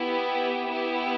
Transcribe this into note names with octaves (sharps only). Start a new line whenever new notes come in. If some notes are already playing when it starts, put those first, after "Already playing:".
Already playing: B3 E4 G4
B3 E4 G4